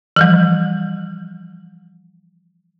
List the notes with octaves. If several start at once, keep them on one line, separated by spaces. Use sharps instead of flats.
E3 F3 G3